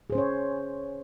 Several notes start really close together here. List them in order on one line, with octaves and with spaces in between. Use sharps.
G#4 C5 C#4 C#5